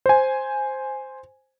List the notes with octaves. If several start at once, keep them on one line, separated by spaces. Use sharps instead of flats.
C5 G#5